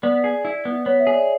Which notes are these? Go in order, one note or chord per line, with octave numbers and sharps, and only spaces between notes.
B3 D5
G#4
E4
B3
B3 C#5
E5
G#4
D5